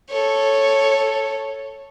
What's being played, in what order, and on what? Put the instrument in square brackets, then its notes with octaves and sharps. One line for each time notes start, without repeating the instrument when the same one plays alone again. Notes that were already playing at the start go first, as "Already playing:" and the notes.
[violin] A4 C#5